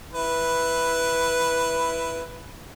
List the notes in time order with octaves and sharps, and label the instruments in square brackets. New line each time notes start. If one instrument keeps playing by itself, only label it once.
[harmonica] E4 B4